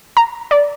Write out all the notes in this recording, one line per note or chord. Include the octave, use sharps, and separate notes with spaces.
A#5
D5